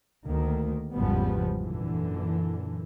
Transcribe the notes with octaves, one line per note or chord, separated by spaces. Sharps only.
D2 D#3 A#3
G#1 E2 C#3 F3 G3 B3
F#2 A#2 D3 E3